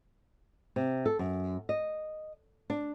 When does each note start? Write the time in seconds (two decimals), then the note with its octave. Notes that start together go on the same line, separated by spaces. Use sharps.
0.76 C3
1.06 A4
1.19 F#2
1.69 D#5
2.70 D4